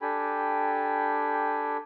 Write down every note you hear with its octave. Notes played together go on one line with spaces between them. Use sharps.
D4 G4 A4 G5 G#5 B5